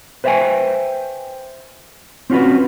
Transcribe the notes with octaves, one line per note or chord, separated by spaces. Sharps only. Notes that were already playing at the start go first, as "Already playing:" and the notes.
B4 C5 E5 F5 G5 G#5
C4 C#4 F4 F#4 B4